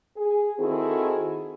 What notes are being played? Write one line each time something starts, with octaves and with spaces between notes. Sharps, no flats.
G#4
D#3 C4 E4 F#4 G#4 A4